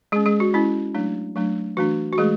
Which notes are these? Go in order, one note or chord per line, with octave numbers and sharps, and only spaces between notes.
G#3 C#4 G#4
G#3 G#4
F#4
G#3 C#4 E4
F#3 A3 D4
F#3 A3 D4
E3 A3 D4 F#4
F#4
E3 G#3 A3 G#4